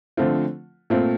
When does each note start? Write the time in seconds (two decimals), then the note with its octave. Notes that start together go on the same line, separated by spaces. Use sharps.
0.17 D3 F3 A3 C4 F4
0.90 A#2 A3 C4 F4